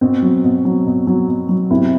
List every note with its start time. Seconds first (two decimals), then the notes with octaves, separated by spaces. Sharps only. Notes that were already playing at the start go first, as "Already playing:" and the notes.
0.01 B2 C4
0.22 F#3
0.44 B2
0.65 F#3
0.87 B2
1.07 F#3
1.28 B2
1.49 F#3
1.71 C3 E4